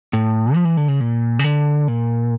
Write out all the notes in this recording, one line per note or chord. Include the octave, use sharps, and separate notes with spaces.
A2
F3
E3
D3
C#3
A#2
C#3
D3
A#2